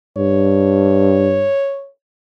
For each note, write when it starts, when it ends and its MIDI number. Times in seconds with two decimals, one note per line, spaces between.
0.17 1.51 43
0.17 1.89 73